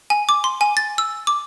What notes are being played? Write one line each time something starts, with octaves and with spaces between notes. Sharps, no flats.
G#5
D6
C6
G#5
A6
E6
D6